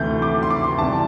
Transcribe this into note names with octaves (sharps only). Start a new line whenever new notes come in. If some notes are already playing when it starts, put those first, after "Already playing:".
Already playing: D2 C3 E3 A3 E4 G6
D6
C6
D6
C6
C2 C3 E3 A5